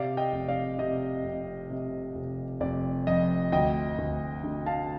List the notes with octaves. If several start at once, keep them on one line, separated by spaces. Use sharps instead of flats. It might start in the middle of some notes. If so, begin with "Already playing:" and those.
Already playing: C3 D5 F5
D#5 G5
F1
D5 F5
C3 D#5
F1
C3
F1
F1 D5
F2 D#5
D2 D#5 G5
D2
D3
F5 A5